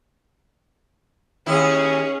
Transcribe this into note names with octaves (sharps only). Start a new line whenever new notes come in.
D#2 C#4 E4 G#4